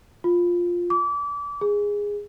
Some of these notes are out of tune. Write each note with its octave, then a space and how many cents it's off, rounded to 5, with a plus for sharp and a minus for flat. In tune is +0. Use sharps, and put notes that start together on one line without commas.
F4 +5
D6 -30
G#4 -15